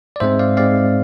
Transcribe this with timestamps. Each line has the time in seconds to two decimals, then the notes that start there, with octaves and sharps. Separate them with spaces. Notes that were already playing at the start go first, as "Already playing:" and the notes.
0.16 D5
0.20 G#2 G#3 C4 C5 E5
0.39 D5 F5
0.57 G#2 G#3 C4 D5 F5